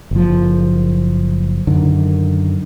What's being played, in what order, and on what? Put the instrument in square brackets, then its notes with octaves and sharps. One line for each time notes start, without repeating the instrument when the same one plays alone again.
[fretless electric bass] F#1 F3
F#2 D3 D#3